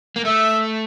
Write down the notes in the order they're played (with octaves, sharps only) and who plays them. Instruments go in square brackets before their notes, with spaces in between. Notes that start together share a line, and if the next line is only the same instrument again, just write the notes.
[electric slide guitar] A#3
[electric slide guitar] A3 [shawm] E5